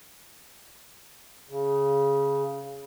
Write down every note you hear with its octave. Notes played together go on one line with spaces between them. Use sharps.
C#3